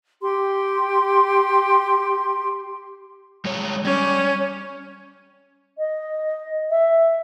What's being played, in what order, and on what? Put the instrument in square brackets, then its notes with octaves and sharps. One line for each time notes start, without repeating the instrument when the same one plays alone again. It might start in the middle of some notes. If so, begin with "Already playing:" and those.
[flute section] G4 C6
[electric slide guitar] G3 G#3 C#5
[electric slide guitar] G3 [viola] C#4
[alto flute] D#5
E5